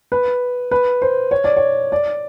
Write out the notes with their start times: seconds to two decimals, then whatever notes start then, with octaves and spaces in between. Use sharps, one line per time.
0.12 B4
0.71 B4
1.02 C5
1.31 C#5
1.44 D5
1.57 C#5
1.92 D5